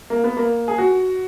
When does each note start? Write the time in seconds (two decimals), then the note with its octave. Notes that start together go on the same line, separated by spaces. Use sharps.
0.10 A#3
0.24 B3
0.37 A#3
0.68 G#4
0.78 F#4